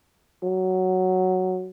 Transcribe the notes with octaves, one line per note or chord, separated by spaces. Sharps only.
F#3